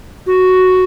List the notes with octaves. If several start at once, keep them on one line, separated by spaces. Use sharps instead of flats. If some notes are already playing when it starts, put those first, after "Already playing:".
F#4